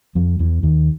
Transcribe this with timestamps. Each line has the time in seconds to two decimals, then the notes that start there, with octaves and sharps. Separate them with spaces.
0.15 F2 F3
0.39 E2 E3
0.63 D#2 D#3